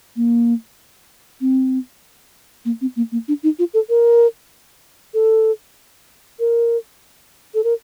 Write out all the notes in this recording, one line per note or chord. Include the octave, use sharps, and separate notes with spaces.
A#3
C4
A#3
C4
A#3
A#3
D4
D#4
F4
A4
A#4
A4
A#4
A4
A#4